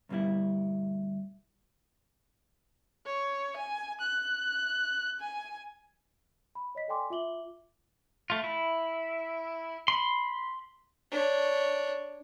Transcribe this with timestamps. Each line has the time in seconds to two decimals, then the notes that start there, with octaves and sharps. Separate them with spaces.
0.09 D2 G2 B2 G3 E4
3.06 C#5
3.57 G#5
4.01 F#6
5.20 G#5
6.55 B5
6.75 C#5 D#5 B6
6.88 A4 D5 G5 G#5 C6 D6
7.10 F4 E5 D6 F#7 G7
8.30 A3 F4
8.44 E4
9.88 B5 C6
11.11 D4 C#5